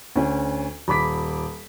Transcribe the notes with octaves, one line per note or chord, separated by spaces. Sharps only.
D2 C#4
D#1 B5 D6 B6